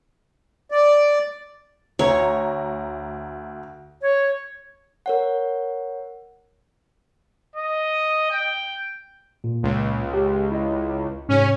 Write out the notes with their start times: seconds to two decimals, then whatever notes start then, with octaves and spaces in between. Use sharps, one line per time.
0.71 D5
1.99 D2 C#5 A#5
4.01 C#5
5.06 A#4 C#5 F#5
7.56 D#5
8.31 G5
9.44 A#2
9.63 C#2
10.14 G4
10.52 E4 D#5
11.29 G#2 C3 C#4